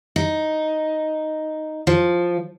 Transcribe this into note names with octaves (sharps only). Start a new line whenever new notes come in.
D#4
F3